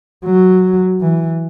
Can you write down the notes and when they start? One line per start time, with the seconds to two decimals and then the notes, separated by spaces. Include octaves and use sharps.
0.24 F#3
1.01 E3